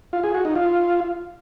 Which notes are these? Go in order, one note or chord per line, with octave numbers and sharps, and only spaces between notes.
F4
G#4
F#4
D#4
F4